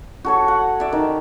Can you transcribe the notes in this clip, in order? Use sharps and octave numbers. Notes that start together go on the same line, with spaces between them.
F#4 A4 C#5
F#5
D5 E5
D#3